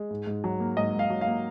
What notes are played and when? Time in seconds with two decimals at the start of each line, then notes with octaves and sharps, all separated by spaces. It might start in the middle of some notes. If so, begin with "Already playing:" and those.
Already playing: G#3
0.11 G#2
0.27 G#2
0.44 F#3
0.60 A#3
0.77 G#2 D#5
0.94 G#2
0.99 F5
1.10 F#3
1.21 F5
1.27 A#3